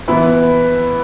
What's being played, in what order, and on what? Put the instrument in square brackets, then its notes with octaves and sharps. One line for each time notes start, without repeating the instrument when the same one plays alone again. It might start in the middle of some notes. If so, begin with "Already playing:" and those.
[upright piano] E3 B3 E4 B4